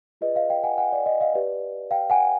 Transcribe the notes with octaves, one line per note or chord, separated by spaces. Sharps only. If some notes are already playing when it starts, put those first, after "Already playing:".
F4 G#4 B4 D5 D#5
D#5 F5
F5 G5
F#5 G#5
F#5 G#5
D5
D#5
D#5 F5
G4 B4 D5
F5 G5
F#5 G#5